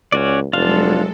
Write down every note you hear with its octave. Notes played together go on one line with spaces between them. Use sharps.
C#2 C#4 F#4 D5
F1 F#3 G#3 D4 F4 A4 F5